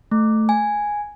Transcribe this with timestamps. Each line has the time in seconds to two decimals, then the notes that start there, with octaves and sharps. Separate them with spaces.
0.11 A3
0.49 G#5